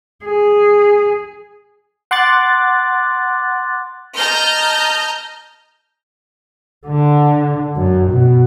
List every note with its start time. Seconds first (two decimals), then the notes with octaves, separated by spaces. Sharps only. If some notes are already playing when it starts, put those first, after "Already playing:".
0.25 G#4
2.11 F#5 C6 D6 F#6 A6
4.16 D#5 A5 A#5 F6 G6 A#6
6.87 D3
7.76 F#2
8.12 B2